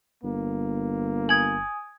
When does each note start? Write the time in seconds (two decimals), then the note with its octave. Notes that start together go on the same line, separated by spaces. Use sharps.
0.23 G1 A#3
1.29 G#5 D#6 G#6 F#7